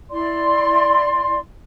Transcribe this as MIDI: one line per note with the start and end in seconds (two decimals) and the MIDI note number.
0.10 1.37 64
0.10 1.37 74
0.10 1.37 84